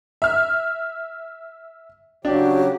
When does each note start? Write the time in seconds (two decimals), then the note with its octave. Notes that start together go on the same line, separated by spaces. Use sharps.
0.22 E5 F6
2.25 C#3 F#3 D4 F#4 G4